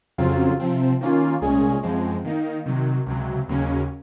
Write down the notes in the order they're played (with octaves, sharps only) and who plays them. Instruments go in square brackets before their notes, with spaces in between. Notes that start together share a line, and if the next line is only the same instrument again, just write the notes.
[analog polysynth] F2 C#3 F#3 C4 F4
C3 F3 C4
D#3 A#3 C#4 F4
C2 A#2 G#3 C#4 G#4
F#2 F3 G#3 C4
D#3 A#3 D#4
C3 D#3 F#3
C#2 C3 F#3
D#2 C#3 F#3 A#3 C#4